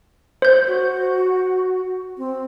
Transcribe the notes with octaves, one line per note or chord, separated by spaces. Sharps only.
C5 G6
F#4
C4